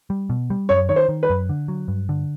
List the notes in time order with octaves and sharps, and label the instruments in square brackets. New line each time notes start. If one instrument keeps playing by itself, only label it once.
[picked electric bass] G3
B2
G3
[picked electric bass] F#2 [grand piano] C#5
[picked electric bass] D#3 [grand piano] C#5
[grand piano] C5
[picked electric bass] D#3
[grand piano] B4
[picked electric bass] F#2
D3
F#3
G2
D3